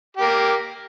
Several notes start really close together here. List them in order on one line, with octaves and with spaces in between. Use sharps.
G4 A#3 A#4